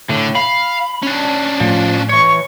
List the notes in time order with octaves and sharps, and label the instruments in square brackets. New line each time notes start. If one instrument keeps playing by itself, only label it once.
[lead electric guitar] A2 [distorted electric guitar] D3
[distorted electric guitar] F5 [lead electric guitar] B5
[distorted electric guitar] C#4 D4
[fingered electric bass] A2 A3 [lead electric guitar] F3
[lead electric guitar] E3 C#5 [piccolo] C#6